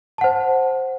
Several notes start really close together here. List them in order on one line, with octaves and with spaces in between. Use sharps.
A5 F#5 C5